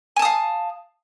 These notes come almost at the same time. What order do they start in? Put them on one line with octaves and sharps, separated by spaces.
G#5 A5 D#6 F5